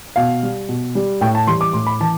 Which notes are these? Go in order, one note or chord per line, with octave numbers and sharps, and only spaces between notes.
B2 F5
G3
B2
G3
A2 G5
A5
E3 G3 C6
D6
A2 C6
B5
E3 A5